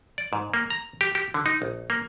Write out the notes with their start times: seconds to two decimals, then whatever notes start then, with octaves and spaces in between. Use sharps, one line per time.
0.18 D5
0.33 G#2
0.54 A#3
0.70 A#5
1.01 G4
1.15 G4
1.34 D3
1.46 D#4
1.62 A#1
1.90 A#3